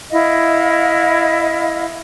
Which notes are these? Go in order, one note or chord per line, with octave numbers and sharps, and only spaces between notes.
E4 D#5 F5